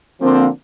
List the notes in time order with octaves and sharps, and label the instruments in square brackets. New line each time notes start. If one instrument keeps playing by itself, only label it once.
[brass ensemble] D3 F3 A#3 C4